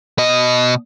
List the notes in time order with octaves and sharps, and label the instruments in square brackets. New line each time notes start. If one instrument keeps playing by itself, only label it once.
[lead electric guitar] B2 D#5